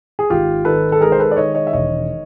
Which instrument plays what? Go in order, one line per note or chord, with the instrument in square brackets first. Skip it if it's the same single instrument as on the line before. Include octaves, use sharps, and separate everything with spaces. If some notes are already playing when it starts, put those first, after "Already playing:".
[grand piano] G#4
G#1 F4 G4
D#3 A4 B4
A4
G#3 G#4 A#4
C5
A4 B4
D5
D#3 C#5 D#5
C#5 D#5
E5
E1 C#5 D#5